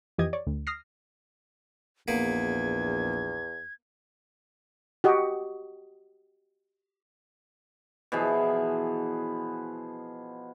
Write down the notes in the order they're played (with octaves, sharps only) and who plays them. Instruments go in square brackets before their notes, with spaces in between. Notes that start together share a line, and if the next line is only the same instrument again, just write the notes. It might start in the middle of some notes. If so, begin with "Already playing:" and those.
[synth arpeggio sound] F2 E3 G4 D#5 G#6
C#5 D5
D2
D#6 F6 A#6 C7
[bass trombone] A#1 [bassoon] E2 [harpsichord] A#3 B3 [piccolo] G#6
[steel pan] F#4 G4 D#5
[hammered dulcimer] B2 E3 F3 G#4